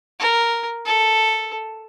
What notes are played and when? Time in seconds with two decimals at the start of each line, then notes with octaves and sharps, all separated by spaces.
0.20 A#4
0.85 A4